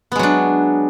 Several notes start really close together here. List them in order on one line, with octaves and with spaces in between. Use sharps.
B3 G#3 F#3 D4